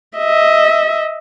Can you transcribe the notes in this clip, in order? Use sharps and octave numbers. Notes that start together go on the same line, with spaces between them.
D#5 E5